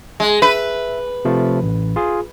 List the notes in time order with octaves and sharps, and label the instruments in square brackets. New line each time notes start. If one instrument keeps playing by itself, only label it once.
[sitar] G#3
[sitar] B4 [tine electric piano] E5
[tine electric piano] C3 F3 A3
A1
F4 G#4